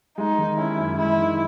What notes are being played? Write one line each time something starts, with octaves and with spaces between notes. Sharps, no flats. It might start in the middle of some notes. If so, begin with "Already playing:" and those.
G#3 D#4
D#3
C#4 E4
F#2
G#3 E4
D#3